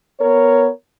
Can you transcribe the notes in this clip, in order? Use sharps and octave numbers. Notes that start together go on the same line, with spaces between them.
B3 A#4 C#5